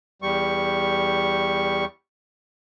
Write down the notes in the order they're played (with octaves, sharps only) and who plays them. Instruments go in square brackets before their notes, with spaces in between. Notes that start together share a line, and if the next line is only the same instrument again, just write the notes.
[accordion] E2 G3 C#6